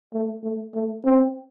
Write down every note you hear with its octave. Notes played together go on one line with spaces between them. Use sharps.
A3
A3
A3
C4